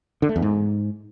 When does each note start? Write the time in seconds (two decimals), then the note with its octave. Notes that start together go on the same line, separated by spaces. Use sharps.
0.22 D3
0.29 A3
0.36 E2
0.42 G#2